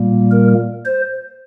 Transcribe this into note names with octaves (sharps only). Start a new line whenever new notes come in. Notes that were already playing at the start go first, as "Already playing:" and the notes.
Already playing: A#2 G3 A#3
A#4
C5